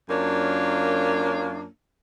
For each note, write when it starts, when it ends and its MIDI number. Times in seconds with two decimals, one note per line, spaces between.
0.10 1.66 42
0.10 1.66 58
0.10 1.66 62
0.10 1.66 65
0.10 1.66 73